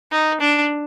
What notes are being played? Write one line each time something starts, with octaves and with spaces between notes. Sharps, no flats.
D#4
D4